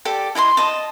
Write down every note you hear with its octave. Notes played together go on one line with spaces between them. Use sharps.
G4 A4 D5
E4 D#5 A5 C6
D#5 A5